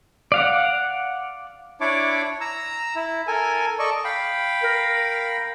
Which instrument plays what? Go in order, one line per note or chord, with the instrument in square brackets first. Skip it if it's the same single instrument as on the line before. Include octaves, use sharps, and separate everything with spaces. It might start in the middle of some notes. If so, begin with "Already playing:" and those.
[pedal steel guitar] D5 F5 F#5
[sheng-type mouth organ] D4 E4 C#5 D5 D6
A#5 E6
E4
A4 A#4 G#5
A4 D5 D#5 C#6
[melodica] F5 G5 B5
[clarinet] A#4